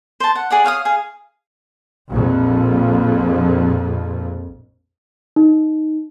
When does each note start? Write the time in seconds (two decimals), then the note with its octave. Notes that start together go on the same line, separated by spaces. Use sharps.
0.20 C5 A5
0.35 F#5
0.50 G#4 D5 F#5
0.64 C#5 F5 F#5 D#6
0.85 G#4 F5
2.10 A#1 F2
5.36 D#4